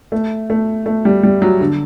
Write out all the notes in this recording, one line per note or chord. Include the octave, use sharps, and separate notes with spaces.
A3
A3
A3
G3
G3
F#3
D3